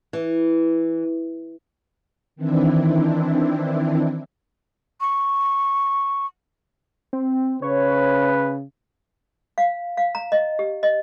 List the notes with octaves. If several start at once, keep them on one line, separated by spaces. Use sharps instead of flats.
E3
D#3 E3 C4 D4 E4
C#6
C4
C#3 B4 C#5
F5
F5
A#5
D#5
G4
D#5